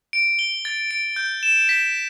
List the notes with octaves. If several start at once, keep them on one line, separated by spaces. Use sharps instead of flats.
D7
G7
A6
D7
G6
E7
B6